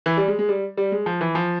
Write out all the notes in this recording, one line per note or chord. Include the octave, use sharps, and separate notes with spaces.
E3
G3
G#3
G#3
G3
G3
G#3
F3
E3
F3